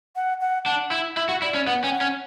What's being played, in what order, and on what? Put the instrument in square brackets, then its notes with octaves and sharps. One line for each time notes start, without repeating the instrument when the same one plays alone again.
[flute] F#5
F#5
[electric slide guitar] D4 [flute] F#5
[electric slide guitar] E4
[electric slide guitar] E4 [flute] E5
[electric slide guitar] F#4
[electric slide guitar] E4 [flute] D5
[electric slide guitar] C#4
[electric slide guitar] B3 [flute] F#5
[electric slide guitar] C#4 [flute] G5
[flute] F#5
[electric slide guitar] C#4